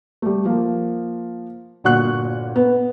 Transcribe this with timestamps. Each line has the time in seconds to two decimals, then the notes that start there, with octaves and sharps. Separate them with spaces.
0.22 G3 A3
0.45 F3 A#3
1.84 G1 A#2 F#4 F#5 C#6 F#6
2.56 B3